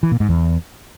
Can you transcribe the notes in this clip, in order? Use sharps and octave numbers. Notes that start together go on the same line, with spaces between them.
E3
A#2
G#2
E2